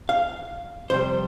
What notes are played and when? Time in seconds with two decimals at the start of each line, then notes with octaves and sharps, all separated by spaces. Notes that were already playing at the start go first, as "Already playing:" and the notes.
0.09 F5
0.90 F2 C3 G3 C5